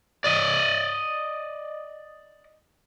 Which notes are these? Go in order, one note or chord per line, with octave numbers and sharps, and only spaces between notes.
D5 D#5